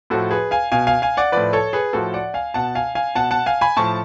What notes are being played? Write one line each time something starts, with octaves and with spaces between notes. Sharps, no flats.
A2 F3 F#4 A4
G#4 B4
F5 G#5
B2 F5 G#5
F5 G#5
F5 G#5
D5 F#5
A2 F3 B4 D5
A4 C#5
G#4 B4
A2 F3 F#4 A4
D5 F#5
F5 G#5
B2 F#5 A5
F5 G#5
F5 G#5
B2 F#5 A5
F#5 A5
F5 G#5
G#5 B5
A2 F3 A5 C#6